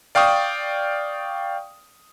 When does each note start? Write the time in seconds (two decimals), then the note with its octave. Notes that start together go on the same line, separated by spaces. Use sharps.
0.15 D5 F5 G5 C#6 D#6